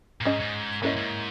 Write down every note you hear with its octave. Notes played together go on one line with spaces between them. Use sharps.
A#2
G#2 C#4 G#4 D#5
G#2
G#2 A#3 C#4 E4 A#4 D#5
G#2